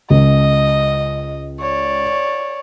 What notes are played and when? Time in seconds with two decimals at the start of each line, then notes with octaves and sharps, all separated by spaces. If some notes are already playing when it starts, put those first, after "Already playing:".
0.10 C#2 D#5
1.61 C#5 D5